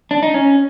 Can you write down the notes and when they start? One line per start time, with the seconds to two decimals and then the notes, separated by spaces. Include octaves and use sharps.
0.11 D4
0.23 D#4
0.34 C#4